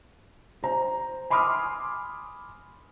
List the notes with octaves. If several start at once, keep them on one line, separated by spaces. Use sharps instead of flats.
C5 A#5
G#5 B5 C6 D6 D#6 F6